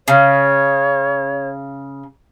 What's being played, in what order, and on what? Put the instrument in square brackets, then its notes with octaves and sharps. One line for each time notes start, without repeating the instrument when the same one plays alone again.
[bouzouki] C#3 [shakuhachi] C#5